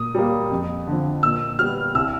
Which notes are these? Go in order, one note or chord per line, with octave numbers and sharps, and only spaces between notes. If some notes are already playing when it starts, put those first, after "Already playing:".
Already playing: A#2 D#6
G3 A#3
F2
D3 F3
A#2 E6
G3 B3 F6
C2 E6